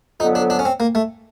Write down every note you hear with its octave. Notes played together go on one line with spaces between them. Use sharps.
F2 D3 F#3 B3 D#4
D4
D4
C#4
C4
A#3
A3